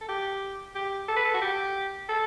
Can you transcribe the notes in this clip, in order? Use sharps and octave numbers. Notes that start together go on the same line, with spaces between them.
A4
G4
G4
A4
B4
A4
F#4
G4
A4